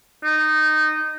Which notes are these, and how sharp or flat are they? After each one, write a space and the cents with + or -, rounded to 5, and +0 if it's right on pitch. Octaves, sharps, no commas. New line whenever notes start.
D#4 -15